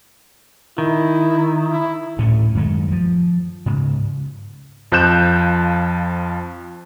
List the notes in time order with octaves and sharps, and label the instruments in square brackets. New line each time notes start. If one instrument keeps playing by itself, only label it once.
[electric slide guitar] D#3 [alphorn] E4
[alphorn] E4
[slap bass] D2 A2 A3 C#4
F#2 D#3 G#3 A3
F3
G#2 C#3
[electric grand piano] F2 F3 F5 F#6 G6 E7